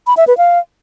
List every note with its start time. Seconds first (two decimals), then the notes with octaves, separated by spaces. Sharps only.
0.07 B5
0.17 E5
0.27 B4
0.38 F5